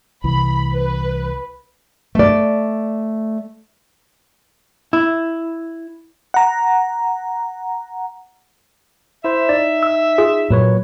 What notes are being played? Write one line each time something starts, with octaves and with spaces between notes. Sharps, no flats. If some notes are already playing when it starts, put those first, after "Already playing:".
C2 E3 B5
B4
A3 D5
E4
F#5 A#5
E4 C5 E5
D#4 D5
E6
F4 G#4
A#2 F#3 B4 C#5